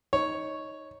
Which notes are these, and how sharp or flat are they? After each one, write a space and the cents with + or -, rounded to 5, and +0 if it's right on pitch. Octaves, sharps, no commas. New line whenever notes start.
D#4 +10 C#5 +0